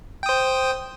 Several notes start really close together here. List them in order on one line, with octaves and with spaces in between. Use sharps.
G5 D#6 C5